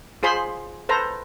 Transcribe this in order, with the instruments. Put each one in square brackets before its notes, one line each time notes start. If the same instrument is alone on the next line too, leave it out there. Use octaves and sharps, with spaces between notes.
[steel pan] F4 G#4 C5 B5 C6
A4 B4 C5 A#5